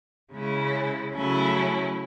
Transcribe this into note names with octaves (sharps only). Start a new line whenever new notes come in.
C#3 G#3 C#4 E4
C#3 F#3 A3 C#4 E4